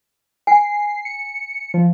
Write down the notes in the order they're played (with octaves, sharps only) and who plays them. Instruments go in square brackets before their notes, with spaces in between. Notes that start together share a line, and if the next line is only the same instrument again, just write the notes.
[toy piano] G#5 [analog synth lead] C7
[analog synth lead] C#7
F3